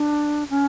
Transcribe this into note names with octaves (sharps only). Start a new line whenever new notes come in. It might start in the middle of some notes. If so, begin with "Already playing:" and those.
Already playing: D4
C#4